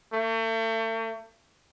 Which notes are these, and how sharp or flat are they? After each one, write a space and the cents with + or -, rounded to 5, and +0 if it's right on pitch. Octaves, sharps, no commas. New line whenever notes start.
A3 +40